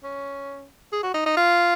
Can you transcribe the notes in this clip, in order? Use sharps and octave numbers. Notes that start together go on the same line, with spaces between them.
C#4
G#4
F#4
D#4
D#4
F4